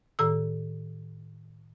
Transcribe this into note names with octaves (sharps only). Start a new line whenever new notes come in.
A2 D#3 A4 E6